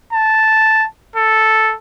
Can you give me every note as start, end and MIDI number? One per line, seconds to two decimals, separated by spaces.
0.13 0.86 81
1.16 1.74 69